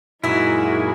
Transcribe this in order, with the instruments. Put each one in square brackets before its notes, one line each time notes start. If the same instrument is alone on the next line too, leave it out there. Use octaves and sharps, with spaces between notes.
[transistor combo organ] F#2 A#2 G#3 [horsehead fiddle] D#4 F#4 [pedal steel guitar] E4 [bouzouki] G#4 E5